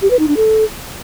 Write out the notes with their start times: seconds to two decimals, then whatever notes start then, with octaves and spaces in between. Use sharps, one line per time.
0.02 G4
0.10 B4
0.19 D#4
0.28 D4
0.37 A4